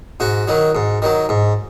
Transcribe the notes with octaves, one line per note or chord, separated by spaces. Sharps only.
G#2 F#4
D#3 F#3
G#2
D#3 F#3
G#2